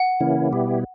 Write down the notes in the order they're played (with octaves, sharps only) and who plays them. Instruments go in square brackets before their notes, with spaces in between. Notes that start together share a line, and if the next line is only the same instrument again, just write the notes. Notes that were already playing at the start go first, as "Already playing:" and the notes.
Already playing: [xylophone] F#5
[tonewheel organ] C#3 E3 A#3 C#4 E4
B2 G3 B3 E4 G4